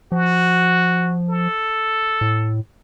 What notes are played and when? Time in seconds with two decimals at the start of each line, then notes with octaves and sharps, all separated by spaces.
0.12 F3 F#4
1.29 A4
2.21 A2